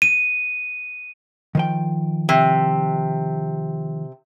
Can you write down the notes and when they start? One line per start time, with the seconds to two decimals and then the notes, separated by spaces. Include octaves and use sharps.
0.02 D#7
1.55 D#3 F3 G5
2.29 C3